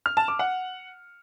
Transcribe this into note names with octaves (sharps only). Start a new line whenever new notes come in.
F6
A5
D6
F#5